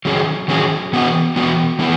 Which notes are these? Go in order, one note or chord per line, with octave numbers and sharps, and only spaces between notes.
D#3 F#3 C#4 G#4
D#3 F#3 C#4 G#4
E3 B3 F#4
E3 B3 F#4
E3 B3 E4 G#4